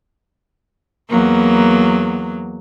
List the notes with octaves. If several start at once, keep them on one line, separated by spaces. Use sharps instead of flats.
E2 F#3 A#3